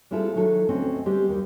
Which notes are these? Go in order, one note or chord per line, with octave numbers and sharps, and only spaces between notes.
G3 G#3 C4 E4 F4 A4
D#3 F#3 E4 A4
D2 C4 C#4 D#5
G3 G#3 B3 C4 G4
D#2 G3